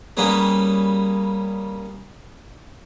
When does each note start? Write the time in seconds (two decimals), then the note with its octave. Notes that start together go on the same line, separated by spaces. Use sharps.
0.17 G3 A#3 B3 C#4 G#4